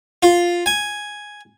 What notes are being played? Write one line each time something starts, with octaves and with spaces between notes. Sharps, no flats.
F4
G#5